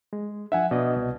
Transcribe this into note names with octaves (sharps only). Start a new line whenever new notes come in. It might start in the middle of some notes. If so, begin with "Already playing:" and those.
G#3
F3 D4 E5 F#5 G#5
B2 D4 D5 D#5
C2